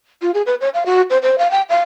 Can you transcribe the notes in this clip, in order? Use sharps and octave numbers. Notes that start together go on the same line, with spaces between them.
F4
G#4
B4
C#5
F5
F#4
C5
C5
F5
G5
F5